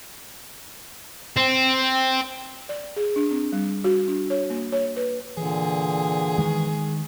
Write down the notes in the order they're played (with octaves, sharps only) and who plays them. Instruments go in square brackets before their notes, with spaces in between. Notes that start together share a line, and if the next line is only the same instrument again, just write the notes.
[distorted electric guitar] C4
[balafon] D5
G#4
D4
C4
G3
F#4
D4
C#5
A#3
C#5
B4
[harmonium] A#2 D3 [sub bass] E3 [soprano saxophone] G#4
[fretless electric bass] D#3 G#3